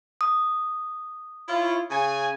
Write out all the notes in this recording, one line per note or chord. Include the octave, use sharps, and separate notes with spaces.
D#6
E4 F4 C#5
C#3 G#5